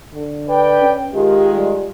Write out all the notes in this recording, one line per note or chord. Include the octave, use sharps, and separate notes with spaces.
D3
B4 D5 G5
C#4
D#3 G#3 F4 G4
G3